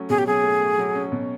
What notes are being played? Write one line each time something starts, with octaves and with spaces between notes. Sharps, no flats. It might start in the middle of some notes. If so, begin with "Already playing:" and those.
Already playing: F#3 A3 C#4
B2 G#4
G4
F#3 G#4
A3
A3
F#3
C#4
B2